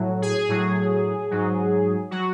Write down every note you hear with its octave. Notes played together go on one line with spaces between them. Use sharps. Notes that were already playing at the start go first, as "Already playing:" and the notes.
Already playing: A2 F#3
G#4
A2 F#3
G#2 F#3
F#3 F#4